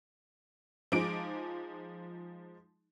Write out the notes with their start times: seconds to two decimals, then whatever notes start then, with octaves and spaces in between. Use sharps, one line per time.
0.92 F3 G#3 D#4 D6 D7